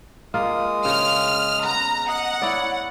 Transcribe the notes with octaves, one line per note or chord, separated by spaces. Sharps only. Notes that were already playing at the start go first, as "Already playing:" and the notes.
G#3 A#3 F4 D#6
C#3 F6
B3 A#5
D#5 F#5 D#6
E4 C#5 D5